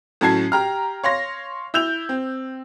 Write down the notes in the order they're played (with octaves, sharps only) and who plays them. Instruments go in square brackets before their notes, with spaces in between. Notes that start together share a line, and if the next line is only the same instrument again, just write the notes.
[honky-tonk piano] A2 F#3 C#4 A5 G#6 C7
G4 A#5 F6
C#5 F5 C6 A#6
E4 E6 G6 F7
C4